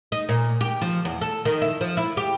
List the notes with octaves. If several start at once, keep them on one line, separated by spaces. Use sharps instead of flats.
D#4
A#2
G4
F3
E2
A4
D#3
E4
F3
E4
G4